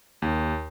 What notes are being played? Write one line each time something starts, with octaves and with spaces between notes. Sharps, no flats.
D#2